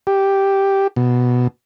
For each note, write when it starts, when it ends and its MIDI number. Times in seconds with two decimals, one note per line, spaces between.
0.07 0.87 67
0.96 1.48 47